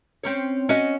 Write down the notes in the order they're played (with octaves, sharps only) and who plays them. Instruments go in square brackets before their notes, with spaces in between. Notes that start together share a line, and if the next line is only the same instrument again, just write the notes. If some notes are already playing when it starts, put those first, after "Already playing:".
[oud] C4 C#4 C#5
C#4 F#4 D#5